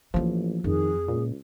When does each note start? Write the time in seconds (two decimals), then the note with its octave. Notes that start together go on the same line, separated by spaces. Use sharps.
0.14 A1 E3 F3 A#3
0.64 F2 D#3 G#4
1.09 C#2 A#2